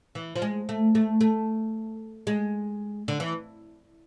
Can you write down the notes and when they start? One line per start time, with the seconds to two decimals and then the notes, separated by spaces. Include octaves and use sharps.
0.15 E3
0.36 F3
0.42 G#3
0.69 A3
0.95 A3
1.21 A3
2.27 G#3
3.08 D3
3.20 E3